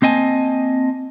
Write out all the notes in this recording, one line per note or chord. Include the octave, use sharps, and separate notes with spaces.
A#3 C4 D#5 G#5 A5